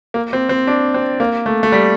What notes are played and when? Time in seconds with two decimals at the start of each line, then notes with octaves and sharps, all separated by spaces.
0.14 A#3
0.33 C4
0.49 C4
0.67 D4
0.94 C4
1.20 A#3
1.46 A3
1.63 A3
1.72 G3